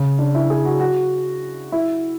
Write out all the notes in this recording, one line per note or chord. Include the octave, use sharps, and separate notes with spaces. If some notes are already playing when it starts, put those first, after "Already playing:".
Already playing: C#3
D4
E4
G#4
F#4
F#4
E4